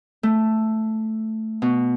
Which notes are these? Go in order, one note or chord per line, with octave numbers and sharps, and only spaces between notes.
A3
B2